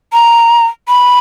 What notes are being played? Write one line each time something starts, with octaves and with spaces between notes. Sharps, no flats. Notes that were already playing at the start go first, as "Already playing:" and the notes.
A#5
B5